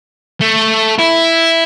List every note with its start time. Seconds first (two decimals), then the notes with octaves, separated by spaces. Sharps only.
0.41 A3
0.98 E4